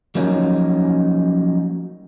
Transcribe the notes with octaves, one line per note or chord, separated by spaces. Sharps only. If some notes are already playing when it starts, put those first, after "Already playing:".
F3 F#3 A#3 C#4 D#4